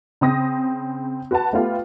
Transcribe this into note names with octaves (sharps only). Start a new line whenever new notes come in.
C#3 C4 D#6 A#6
F#4 B4 F#5 A5
A3 B3 F4 G4